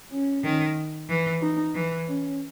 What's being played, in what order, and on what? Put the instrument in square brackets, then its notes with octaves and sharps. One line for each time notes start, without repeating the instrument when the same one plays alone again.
[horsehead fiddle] C#4
[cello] D#3
E3
[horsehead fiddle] D#4
[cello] E3
[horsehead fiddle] C#4